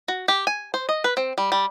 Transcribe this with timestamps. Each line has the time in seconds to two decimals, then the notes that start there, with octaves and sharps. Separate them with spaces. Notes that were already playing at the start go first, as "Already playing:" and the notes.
0.08 F#4
0.28 G4
0.47 G#5
0.74 C5
0.89 D#5
1.04 B4
1.17 C4
1.38 G3
1.52 G3